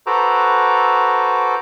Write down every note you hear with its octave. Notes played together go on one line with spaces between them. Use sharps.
F#4 A4 B4 C5 A#5 D6